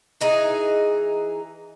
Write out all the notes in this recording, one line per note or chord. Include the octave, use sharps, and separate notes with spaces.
E3 D#4 G#4